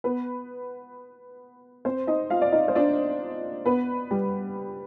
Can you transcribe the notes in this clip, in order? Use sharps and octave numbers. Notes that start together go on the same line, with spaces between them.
B3 B4
C4 C5
D#4 D#5
F4 F5
D5
D#4 D#5
C5
D4 D5
B3 B4
G3 G4